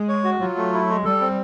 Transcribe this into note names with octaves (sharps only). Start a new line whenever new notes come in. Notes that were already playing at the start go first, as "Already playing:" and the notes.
Already playing: G#3
C#5
F#4
F#3 F4
A3
E4
G#3
G3 A4
C4